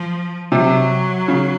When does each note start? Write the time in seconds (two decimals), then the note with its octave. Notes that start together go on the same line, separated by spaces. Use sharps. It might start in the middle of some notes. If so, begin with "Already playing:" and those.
Already playing: F3
0.51 C3 F#3
1.28 C#3